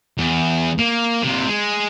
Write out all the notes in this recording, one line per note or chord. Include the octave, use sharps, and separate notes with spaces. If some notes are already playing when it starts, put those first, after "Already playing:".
E2
A#3
C3 A#3
G#3